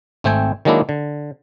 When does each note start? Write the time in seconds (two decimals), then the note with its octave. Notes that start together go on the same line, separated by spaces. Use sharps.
0.24 G#1 A3 C4 G5 G#5
0.65 D#3 F#3 G#3 A#3 D4 E4
0.89 D3